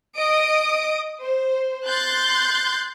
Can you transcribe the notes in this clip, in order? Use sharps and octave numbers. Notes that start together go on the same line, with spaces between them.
D#5 D#6 D7
C5
C6 F#6 G6 A6